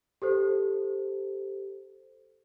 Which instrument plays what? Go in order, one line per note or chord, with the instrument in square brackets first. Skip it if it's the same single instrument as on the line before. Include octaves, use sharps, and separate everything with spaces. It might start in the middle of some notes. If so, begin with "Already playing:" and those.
[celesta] G4 A4 C5